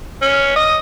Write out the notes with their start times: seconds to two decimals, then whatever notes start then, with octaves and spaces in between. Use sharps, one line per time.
0.22 C#4
0.56 D#5